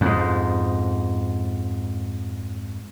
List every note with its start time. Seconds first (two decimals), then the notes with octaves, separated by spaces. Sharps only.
0.01 F2 G#2